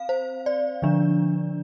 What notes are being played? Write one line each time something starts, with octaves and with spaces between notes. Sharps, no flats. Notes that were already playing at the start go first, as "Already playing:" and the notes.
Already playing: C4 F5
C5
D5
D3 F3 D4